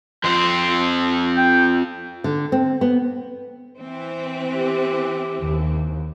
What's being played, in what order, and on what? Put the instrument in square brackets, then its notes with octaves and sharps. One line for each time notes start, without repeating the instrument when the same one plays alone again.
[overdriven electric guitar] F2 C4 [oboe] C6
[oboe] G5
[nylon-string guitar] D3
C4
B3
[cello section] E3 C4
[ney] G4
[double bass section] D#2